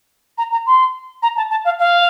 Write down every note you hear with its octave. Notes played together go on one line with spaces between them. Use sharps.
A#5
A#5
C6
A#5
A5
A5
F5
F5